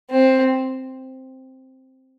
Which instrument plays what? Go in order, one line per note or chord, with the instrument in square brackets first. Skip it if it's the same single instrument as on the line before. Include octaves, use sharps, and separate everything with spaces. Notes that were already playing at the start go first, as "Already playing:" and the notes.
[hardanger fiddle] C4